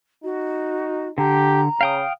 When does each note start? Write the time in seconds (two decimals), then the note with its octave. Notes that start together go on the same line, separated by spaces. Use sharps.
0.24 D#4 F#4
1.18 D3 G4 A#5
1.81 C#3 F5 G5 D#6